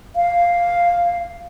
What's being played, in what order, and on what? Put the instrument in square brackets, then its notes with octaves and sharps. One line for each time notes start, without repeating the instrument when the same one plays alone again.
[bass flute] F5